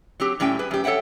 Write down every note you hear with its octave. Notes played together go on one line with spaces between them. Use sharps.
F#3 C4 G4
A2 G3 C#4 G4 G5
G#4 B4
F#2 G4
A4 C#5 E5 F#5 G5